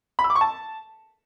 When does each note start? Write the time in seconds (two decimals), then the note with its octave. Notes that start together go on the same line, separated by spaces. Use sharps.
0.19 B5
0.24 E6
0.30 D6
0.35 C#6
0.41 A5